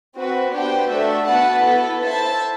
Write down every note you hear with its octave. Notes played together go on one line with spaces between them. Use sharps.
C4 F#4 B4
B3 D4 G4 C5 G5
A3 D4 F#4 A4 E5
B3 F#4 B4 F#5 A5
B3 E4 A4
E4 A4 C5 E5 A5